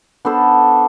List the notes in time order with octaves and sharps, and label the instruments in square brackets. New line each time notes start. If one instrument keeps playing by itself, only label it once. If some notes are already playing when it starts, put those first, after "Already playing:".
[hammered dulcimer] B3 D4 A4 C5